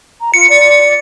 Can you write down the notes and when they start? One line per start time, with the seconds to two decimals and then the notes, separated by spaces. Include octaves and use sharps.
0.21 A#5
0.34 F4 C#7
0.49 D5